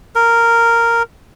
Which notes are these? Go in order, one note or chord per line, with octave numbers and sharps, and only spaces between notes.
A#4